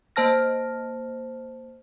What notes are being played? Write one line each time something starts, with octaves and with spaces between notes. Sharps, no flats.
A#3 C5 A5 F6 A#6